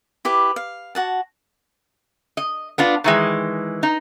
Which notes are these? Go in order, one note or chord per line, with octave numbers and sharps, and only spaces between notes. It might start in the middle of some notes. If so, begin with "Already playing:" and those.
E4 G4 B4 D6
F5
F#4 F#5 A5
D#5
B3 D4 F4
D#3 E3 G#3
D#4